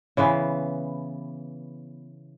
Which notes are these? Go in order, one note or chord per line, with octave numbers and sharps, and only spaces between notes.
C#3 E3 B3 C5